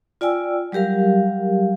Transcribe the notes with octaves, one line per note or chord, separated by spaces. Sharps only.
F4 D5 G5 G#5 E6
F#3 G3 G4 A#4 F5